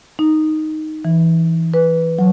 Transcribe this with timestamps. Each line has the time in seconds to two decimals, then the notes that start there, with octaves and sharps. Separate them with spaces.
0.19 D#4
1.05 E3
1.74 B4
2.19 F#3